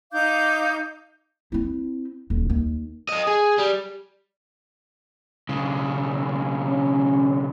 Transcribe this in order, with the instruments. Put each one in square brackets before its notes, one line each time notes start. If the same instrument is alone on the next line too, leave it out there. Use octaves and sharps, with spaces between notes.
[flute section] D#4 F5 D6 G6
[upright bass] C4 E4
D#1
D#2
[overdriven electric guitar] A4 D#5
G#4
G3
[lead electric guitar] B1 C#3
[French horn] C#4